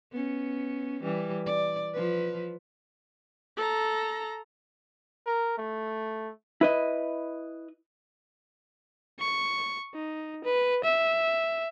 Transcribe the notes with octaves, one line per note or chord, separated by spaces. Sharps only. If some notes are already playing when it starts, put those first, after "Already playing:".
B3 C#4
E3 G3
D5
F3 B4
A4 A#5
A#4
A3
E4 B4 D#5
C#6
D#4
B4
E5